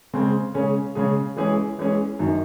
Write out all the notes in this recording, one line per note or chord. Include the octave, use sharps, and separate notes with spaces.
C#3 G#3 C4
C#3 G#3 C#4 G#4
C#3 G#3 C#4 G#4
E3 G#3 C#4 G#4
E3 G#3 C#4 G#4
F#2 D#3 F#3